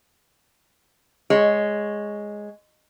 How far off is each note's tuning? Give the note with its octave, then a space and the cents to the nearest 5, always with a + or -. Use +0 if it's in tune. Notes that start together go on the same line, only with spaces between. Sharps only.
G#3 +0 C#5 +0